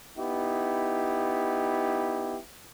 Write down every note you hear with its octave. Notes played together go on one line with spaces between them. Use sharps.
B3 D#4 E4 G4